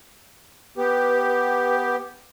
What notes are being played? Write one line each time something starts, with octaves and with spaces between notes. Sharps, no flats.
B3 G4 B4
B4